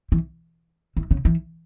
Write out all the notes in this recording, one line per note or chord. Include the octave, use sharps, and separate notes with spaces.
E3
E3
C#3
E3